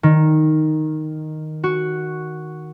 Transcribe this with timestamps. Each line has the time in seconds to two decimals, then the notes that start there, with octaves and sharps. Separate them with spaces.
0.03 D#3
1.64 F#4